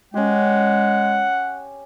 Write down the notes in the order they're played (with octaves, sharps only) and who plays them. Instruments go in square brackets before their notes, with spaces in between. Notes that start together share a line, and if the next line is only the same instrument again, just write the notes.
[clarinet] G#3 [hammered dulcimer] C#4 G4 [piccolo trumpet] F#5